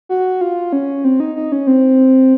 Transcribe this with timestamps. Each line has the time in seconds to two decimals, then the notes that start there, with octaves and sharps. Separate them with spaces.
0.09 F#4
0.41 F4
0.73 C#4
1.04 C4
1.20 D#4
1.36 D#4
1.52 C#4
1.67 C4